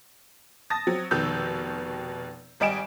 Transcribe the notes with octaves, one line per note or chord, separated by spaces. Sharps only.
A5 D#6 A6 A#6
F#3 C4
F1 B2 D#3 E6 G6
G#1 G3 D#5 G#5 D7 E7